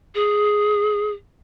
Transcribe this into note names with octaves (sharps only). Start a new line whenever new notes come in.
G#4